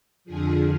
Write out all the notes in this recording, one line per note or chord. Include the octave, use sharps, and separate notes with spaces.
F2 D3 F3 G#4